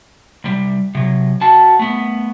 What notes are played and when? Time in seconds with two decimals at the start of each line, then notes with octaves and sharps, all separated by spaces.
0.44 C2 G3
0.95 C3 F#3
1.41 F#4 A5
1.79 A3 B3